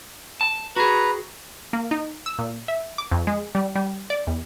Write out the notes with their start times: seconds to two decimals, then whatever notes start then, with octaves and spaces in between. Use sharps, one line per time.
0.41 A5
0.76 F#4 G#4 B4 A#5
1.73 A#3
1.91 D#4
2.26 E6
2.39 A#2
2.68 E5
2.98 D6
3.11 F2
3.27 G#3
3.55 G3
3.75 G3
4.10 D5
4.27 E2